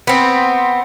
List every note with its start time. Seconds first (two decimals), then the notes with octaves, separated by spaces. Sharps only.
0.07 B3 C4